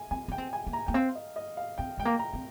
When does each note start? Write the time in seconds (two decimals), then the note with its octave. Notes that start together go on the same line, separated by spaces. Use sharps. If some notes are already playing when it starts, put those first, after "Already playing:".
Already playing: G#5
0.11 C4 G#5
0.28 D4 G5
0.38 C4
0.53 G#5
0.67 A#3
0.73 A#5
0.86 A#3 G5
0.94 C4 F5
1.15 D#5
1.36 D#5
1.57 F5
1.78 C4 G5
1.98 G#3 G5
2.05 A#3
2.19 A#5
2.34 C4